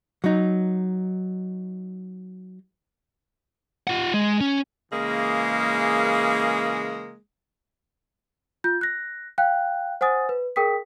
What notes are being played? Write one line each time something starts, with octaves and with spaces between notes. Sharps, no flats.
F#3 D#4
F4 F#5
G#3
C#4
C#3 E3 G#3 A#3
F4 G6
F#6 A#6
F5 G5 F#6
C5 F#5 G#5 D#6 A6
B4
G#4 A#4 G5 D#6 B6